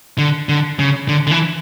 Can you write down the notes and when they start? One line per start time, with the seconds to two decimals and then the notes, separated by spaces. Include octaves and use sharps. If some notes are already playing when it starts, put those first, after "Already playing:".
0.18 D3
0.49 D3
0.79 C#3
1.08 D3
1.27 D3
1.31 E3